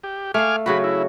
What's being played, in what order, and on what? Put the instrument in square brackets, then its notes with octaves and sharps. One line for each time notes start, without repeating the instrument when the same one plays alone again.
[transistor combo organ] G4
[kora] A3 F5 [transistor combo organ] G#5 D6 F6
[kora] C#3 F#3 F#4 [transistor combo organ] B5
[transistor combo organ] E4